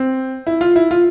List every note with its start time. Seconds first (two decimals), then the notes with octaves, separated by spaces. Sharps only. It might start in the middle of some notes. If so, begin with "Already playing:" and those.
Already playing: C4
0.47 E4
0.61 F4
0.76 E4
0.91 F4